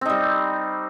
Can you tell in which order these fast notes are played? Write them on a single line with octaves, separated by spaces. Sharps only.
C4 D#4 G3